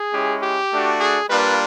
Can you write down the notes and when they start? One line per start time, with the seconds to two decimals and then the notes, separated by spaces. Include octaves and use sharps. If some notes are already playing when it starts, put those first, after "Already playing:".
Already playing: G#4
0.13 G#3 C#4 E4 G4
0.42 G4
0.71 A3 D4 F#4
0.99 G#4
1.29 G3 A#3 D4 F4 B4